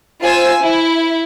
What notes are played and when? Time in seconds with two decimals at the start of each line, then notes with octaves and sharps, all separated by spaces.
0.22 F4 C5 G#5 E6
0.61 E4